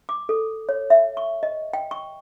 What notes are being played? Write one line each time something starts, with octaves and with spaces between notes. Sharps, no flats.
D6
A4
C#5
E5
C#6
D#5
G5
C#6